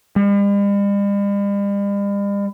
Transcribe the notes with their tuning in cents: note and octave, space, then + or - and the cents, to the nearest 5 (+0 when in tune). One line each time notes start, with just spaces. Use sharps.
G3 +45